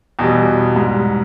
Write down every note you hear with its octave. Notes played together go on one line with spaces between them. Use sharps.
E2 B2 G3
G#2 G3